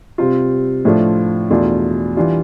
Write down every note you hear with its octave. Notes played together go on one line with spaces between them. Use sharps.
C3 G3 C4 F4
A2 F3 A3 D4 F4
E2 B2 A3 D4 F4
E3 G3 D4 F4